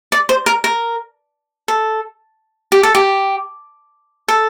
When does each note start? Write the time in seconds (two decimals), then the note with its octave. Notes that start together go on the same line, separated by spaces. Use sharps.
0.12 D5
0.29 C5
0.46 A#4
0.64 A#4
1.68 A4
2.72 G4
2.83 A4
2.95 G4
4.28 A4